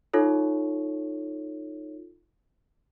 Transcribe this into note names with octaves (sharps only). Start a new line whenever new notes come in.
D#4 F4 A4 C#5